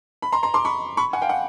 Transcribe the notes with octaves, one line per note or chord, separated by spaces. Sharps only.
B5
A#5 C6
A#5 C6
C6 D6
B5 C#6
B5 C#6
F#5 G#5
F5 G5
F#5